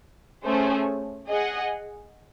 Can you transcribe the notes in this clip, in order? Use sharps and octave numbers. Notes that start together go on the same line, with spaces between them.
A3 C#4 G#4 C5
G#4 D#5 F#5